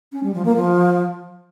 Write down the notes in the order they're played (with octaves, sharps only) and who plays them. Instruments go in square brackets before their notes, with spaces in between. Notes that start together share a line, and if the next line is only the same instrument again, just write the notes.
[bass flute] C#4
G3
F3
A#3
F3